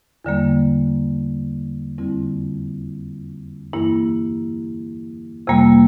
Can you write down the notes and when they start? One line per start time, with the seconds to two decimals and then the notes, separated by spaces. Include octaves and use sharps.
0.25 E2 D3 G3 A#3
1.98 F2 D3 G3 C4 E4
3.73 G2 E3 A#3 E4
5.47 F2 C3 G3 A#3